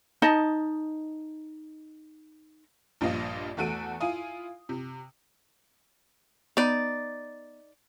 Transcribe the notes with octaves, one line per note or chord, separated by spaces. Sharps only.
D#4 D#5 A5
A#1 G2 A#2 F3 F4 D#5
E2 A3 F#4 A4 D7 D#7
E4 F4 F5 G#5 D#6
C3
B3 D#4 D5 B5